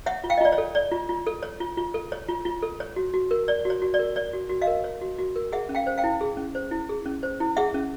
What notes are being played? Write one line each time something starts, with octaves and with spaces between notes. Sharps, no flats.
C#5 E5 F#5
F4
F5 G5
D#5
F4 D5
C#5
A4
C#5 D5
F4
F4
A4
C#5
F4
F4
A4
C#5
F4
F4
A4
C#5
F#4
F#4
A#4
C#5 D5
F#4 C#5
F#4
D5
A#4
C#5 D5
F#4
F#4
D#5 F5
A#4
C#5
F#4
F#4
A#4
G#4 E5 F#5
C#4
F5 G5
C5
F5 G5
E4
G#4
C#4
C5
E4
G#4
C#4
C5
E4
G#4 E5 F#5
C#4